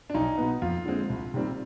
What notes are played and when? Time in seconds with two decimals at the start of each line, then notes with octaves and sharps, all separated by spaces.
0.10 D4
0.14 B1 D#4
0.38 B2 B3
0.62 F2 F4
0.86 D3 G#3 C4
1.10 C2
1.34 C3 D#3 G3 C4